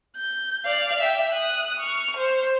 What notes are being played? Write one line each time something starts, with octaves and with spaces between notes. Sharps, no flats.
G6
D5 F5
E5 G5
D#6 F#6
C#6 F6
C5